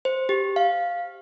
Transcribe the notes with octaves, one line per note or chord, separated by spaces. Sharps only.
C5
G4
F5